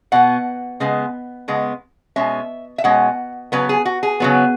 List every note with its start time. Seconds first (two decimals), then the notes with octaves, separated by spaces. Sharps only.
0.12 B2 B3 F#5
0.80 C#3 G#3 B3
1.48 C#3 G#3 B3
2.16 B2 G#3 C#4 E5
2.78 E5
2.84 B2 G#3 C#4 F#5
3.52 C#3 F#3 B3 B4
3.69 G#4
3.85 F#4
4.03 G#4
4.20 C#3 F#3 B3